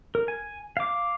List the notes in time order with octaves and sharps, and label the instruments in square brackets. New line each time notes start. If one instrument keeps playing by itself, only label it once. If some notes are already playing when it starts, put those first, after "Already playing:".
[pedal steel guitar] A#4
G#5
F5 D6